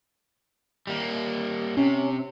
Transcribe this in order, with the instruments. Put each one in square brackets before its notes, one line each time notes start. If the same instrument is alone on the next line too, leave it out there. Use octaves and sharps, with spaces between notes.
[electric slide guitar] G3 A#3
[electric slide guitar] C3 [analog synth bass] C#4